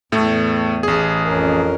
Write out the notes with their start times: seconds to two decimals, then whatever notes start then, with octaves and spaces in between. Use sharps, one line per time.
0.12 E2 A2 A3
0.83 A1 G#4
1.26 F2 C#4 A#4